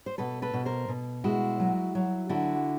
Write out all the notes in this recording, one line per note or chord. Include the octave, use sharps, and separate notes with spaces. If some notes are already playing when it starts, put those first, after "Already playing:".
C5
B2 A4 B4
A4 B4
B2
A#4 C5
B2
G#3 E4 F#4
F#3
F#3
D3 E4 F#4